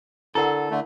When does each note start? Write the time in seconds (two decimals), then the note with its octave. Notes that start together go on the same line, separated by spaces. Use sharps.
0.35 D3 E4 A4 A#4 F#5
0.71 D3 A3